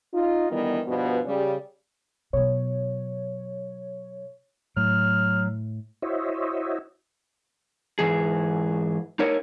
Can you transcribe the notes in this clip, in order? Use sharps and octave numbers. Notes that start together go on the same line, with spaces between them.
D#4 F4
D2 D#3 E3 G3 B3
G2 B2 F3 B3
C#3 G3
B2 F#3 C#5
A2 F#3 F6
E4 F#4 C5 C#5 D#5 E5
G#2 E3 G#4
D#4 A#4 C#5